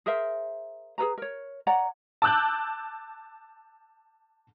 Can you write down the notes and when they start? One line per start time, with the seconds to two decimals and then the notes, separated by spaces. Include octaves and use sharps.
0.06 G#4 A#4 C5 E5
0.98 G#4 A4 B4 A#5
1.18 A#4 C#5
1.67 C#5 D5 F#5 A#5
2.22 A5 D6 E6 F#6 G6